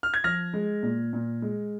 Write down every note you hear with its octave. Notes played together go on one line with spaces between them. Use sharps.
F6
G#6
F3 F6 A#6
G#3
A#2
A#2
G#3